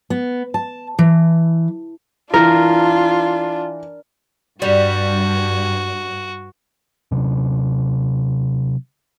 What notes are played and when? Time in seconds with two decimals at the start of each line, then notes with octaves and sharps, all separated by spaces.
0.10 B3
0.54 A5
0.99 E3
2.34 E3 D4 F4 A#4
4.62 G2 G3 F#4
7.12 C3 F#3 C#4